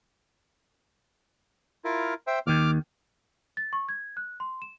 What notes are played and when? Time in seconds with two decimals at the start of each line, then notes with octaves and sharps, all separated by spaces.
1.85 E4 F4 A#4
2.27 C5 E5 G5
2.47 D#2 D#3 D6 F6
3.57 A6
3.73 C#6
3.89 G#6
4.17 F#6
4.40 C6
4.62 E7